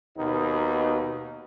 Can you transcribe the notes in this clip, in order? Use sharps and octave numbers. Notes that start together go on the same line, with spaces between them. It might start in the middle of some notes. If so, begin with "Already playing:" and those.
D#2 B2 A#3 B3 D#4